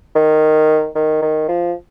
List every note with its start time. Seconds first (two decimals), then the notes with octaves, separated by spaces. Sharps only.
0.15 D#3
0.95 D#3
1.22 D#3
1.48 F3